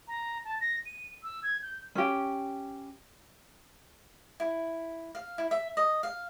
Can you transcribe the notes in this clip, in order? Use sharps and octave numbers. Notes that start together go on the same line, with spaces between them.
A#5
A5
A#6
D#7
E6
G#6
G6
C#4 G4
E4
F5
E4
E5
D#5
F5